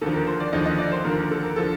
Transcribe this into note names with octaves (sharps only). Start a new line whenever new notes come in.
D#2 D3 F3 A4
A#4
C5
D5
D#2 D3 F3 D#5
D#5
D5
C5
D#2 D3 F3 A#4
A#4
A4
A#4
D3 F3 A4